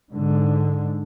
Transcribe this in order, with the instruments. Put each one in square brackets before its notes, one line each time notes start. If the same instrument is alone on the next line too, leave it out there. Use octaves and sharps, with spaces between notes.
[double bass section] G#2 D3